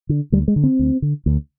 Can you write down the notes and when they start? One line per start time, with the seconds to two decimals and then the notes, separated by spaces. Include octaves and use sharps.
0.09 D3
0.32 D2 G3
0.48 G#3
0.56 D3
0.64 C4
0.79 D2
1.02 D3
1.26 D2